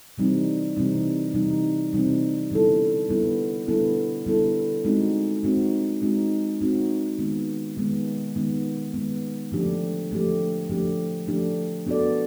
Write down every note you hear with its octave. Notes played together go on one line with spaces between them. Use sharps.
C3 E3 G3 C4 D#4
C3 E3 G3 C4 D#4
C3 E3 G3 C4 D#4
C3 E3 G3 C4 D#4
D3 G3 B3 E4 A4
D3 G3 B3 E4 A4
D3 G3 B3 E4 A4
D3 G3 B3 E4 A4
G#3 C4 D#4 F#4
G#3 C4 D#4 F#4
G#3 C4 D#4 F#4
G#3 C4 D#4 F#4
D#3 G#3 B3
D#3 G#3 B3
D#3 G#3 B3
D#3 G#3 B3
D3 F3 A3 D4 G4
D3 F3 A3 D4 G4
D3 F3 A3 D4 G4
D3 F3 A3 D4 G4
B3 D4 F#4 A4 D5